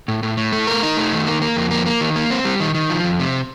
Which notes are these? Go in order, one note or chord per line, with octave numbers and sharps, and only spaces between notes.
A2
A2
A2
A3
A#4
D#4
A3
D#3
A#3
A#3
F2
A#3
A#3
D#3
A#3
C4
G3
D#3
D#3
F3
F2
C3